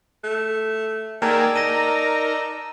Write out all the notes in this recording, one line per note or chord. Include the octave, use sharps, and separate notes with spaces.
A3
D#3 A#3 G#4 D5 A5 A#5 E6 A6
D#4 A#4 A#6 D#7